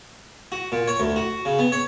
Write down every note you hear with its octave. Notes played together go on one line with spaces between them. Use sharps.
F#4
A#2
C#5
D2
F#4
C#3
B3
C#5